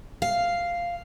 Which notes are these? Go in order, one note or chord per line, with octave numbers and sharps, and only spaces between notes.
F5